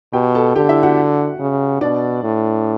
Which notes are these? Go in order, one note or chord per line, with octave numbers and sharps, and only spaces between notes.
B2 G4 G5
A4 A5
D3 G4 G5
E4 E5
F#4 F#5
C#3
B2 D4 D5
A2